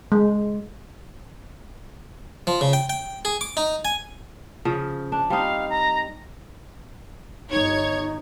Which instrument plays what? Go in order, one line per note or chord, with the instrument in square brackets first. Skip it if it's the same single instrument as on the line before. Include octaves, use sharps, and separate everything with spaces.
[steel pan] G#3
[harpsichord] F3
C#3
G5
G5
G#4
D6
D#4
G#5
[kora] C#3 F3
D4
[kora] G3 C4 D#4 [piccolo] F5
[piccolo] A#5
[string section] G1 C#5 G#6 [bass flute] D#4